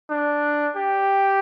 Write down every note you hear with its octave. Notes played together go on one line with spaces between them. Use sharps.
D4
G4